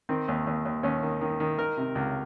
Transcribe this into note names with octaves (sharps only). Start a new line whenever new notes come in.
D#3 C4
D#2
D#2
D#2
D#2 C#4
D#3
D#3
D#3
D#3 A#4
C3
C#2